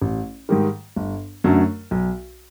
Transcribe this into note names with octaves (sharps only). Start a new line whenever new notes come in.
A1
G#2 D#3 G3
G1
F#2 D3 F#3 A3
B1